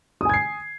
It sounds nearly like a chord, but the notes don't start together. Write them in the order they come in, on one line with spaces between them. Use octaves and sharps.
D#6 G#5 G#6 C7